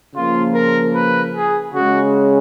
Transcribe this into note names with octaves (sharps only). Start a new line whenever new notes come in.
C#3 F3 A#3 F4
A#4
B4
G#4
C#3 G#3 F#4